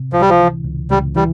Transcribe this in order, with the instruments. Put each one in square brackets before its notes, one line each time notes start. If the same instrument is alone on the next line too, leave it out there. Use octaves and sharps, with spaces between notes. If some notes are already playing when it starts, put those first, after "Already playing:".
Already playing: [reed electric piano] C3
[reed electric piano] C#2 [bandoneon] F3
[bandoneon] G3
F3
[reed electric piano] E3
C#2
[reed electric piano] C#2 [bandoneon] G3
[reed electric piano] E3 [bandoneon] G3